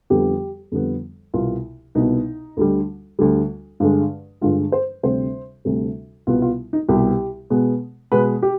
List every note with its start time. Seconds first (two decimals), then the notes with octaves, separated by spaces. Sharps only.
0.10 F2 D3 G3 B3 G4
0.72 F2 D3 G3 B3
1.34 C2 B2 B3 F4
1.95 C2 B2 B3 D#4
2.57 D2 D3 G3
3.19 D2 D3 G3
3.80 G2 D3 G#3
4.41 G2 D3 G#3 F4
4.72 C5
5.03 D2 C3 G3 C4 C5
5.65 D2 C3 G3 C4
6.27 C2 B2 G3 B3 F4
6.42 F4
6.73 D#4
6.88 C2 B2 G3 B3 G4
7.50 B2 G#3 B3
8.12 B2 G#3 B3 B4
8.42 G4